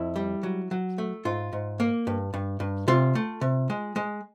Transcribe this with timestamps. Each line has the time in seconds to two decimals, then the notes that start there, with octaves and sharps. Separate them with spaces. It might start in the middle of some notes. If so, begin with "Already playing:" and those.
Already playing: F2 E4
0.16 G3
0.43 F#3
0.71 F#3
0.98 A3
1.25 G#2 F4
1.53 G#2
1.80 A#3
2.07 G2
2.34 G2
2.60 G2
2.88 C3 F4
3.15 A3
3.41 C3
3.70 G#3
3.96 G#3